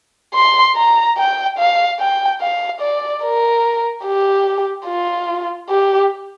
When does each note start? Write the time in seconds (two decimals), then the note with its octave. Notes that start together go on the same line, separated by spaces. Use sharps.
0.34 C6
0.76 A#5
1.18 G5
1.58 F5
1.99 G5
2.41 F5
2.81 D5
3.23 A#4
4.05 G4
4.87 F4
5.70 G4